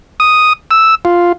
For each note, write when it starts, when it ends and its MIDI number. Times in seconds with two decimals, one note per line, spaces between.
0.20 0.53 87
0.71 0.95 88
1.05 1.32 65